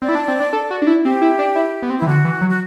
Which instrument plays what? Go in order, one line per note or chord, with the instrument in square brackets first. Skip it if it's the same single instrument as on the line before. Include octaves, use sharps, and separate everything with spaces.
[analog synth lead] C4 [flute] D5
[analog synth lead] E4
D4
C4
D4
A4
F#4
D4
E4
[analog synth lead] C4 [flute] G4
[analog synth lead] E4
D4
E4
B3
C4
[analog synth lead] E3 [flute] E4
[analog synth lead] D3 [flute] F#4
[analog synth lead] E3
F#3
[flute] F#4